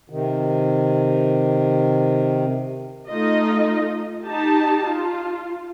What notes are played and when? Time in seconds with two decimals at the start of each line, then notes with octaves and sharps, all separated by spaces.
0.10 C3 D#3
3.10 A3 D#4 F4 D#5
4.25 D#4 G4 A5
4.86 F4